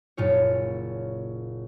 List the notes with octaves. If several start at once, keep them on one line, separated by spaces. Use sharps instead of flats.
F#1 A#2 F4 C#5